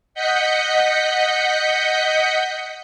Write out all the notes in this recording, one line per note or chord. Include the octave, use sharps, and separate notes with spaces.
D#5 F#5 G6 B6 C#7